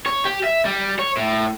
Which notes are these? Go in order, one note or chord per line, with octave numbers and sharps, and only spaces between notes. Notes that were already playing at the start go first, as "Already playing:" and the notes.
C#5
G4
E5
G3
C#5
A2